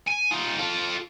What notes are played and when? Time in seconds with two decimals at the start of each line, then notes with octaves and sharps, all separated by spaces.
0.07 G#5
0.31 D#4 F4
0.59 F4 A4